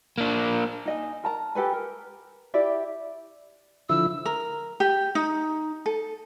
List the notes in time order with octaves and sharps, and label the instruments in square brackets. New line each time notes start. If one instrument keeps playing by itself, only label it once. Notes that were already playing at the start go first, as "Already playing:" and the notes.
[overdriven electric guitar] A#3 D4
[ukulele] D#4 D#5 G#5
A#4 A5 A#5
G4 A4 B4 G#5
A#4
E4 G4 D5 E5
[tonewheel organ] D3 F3 E4 [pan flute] E6
[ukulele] A#4
G4
D#4
A4